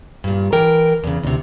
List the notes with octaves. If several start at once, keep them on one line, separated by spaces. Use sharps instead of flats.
G2 A#2
E3 A#4 G5
E2 C#3
D2 C3